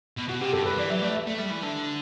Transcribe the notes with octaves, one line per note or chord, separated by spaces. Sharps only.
B2
B2 F#4
C3 G4
G2 A4
G2 B4
E3 D5
F#3 E5
A3 D5
E5
A3
G3
E3
D3